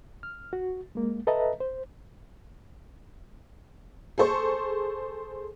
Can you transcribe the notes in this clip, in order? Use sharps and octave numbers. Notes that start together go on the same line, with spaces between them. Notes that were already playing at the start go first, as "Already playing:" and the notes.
F6
F#4
G#3 A#3
A4 B4 D#5 E5 A5 A#5
C5
G#4 A4 C5 C#6